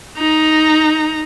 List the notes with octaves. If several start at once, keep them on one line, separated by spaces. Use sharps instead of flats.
D#4 A#5